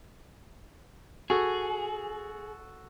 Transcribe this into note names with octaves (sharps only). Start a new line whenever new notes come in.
F#4 G#4 A4